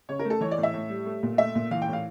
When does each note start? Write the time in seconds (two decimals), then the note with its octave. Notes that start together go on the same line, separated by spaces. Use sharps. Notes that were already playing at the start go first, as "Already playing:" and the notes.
0.09 C#3 C#5
0.19 A#4
0.25 A3
0.30 A4
0.41 E3 C#5
0.51 D5
0.58 A2
0.63 E5
0.74 A2
0.90 G3
1.06 A3
1.23 A#2
1.38 A3 E5
1.55 A#2
1.71 E3 F5
1.82 G5
1.88 A2
1.93 F5